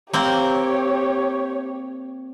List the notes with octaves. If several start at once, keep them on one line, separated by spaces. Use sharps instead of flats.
A#3 C4 G4 C#5